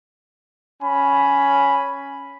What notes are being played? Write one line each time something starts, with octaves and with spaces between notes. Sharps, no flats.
C#4 G#5 B5